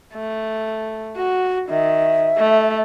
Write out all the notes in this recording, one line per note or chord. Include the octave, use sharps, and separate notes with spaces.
A3
F#4
D#3 E5
A3